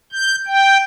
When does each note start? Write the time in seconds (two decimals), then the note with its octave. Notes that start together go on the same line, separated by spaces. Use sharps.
0.12 G6
0.46 G5